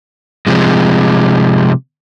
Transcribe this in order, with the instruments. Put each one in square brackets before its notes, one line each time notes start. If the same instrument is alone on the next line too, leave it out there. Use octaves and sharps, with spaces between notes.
[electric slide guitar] C3 F3 G#3